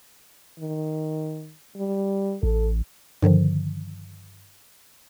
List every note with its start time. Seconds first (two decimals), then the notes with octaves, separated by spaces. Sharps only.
0.60 D#3
1.77 G3
2.43 A1 A4
3.22 G2 D3 D#3 F3